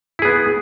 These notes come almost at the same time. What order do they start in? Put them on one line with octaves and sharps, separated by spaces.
E4 G#4 B3